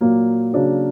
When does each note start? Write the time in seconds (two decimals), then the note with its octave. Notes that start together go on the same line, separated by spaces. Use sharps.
0.01 A#2 F#3 A#3
0.53 C#3 F#3 A#3 D4 F#4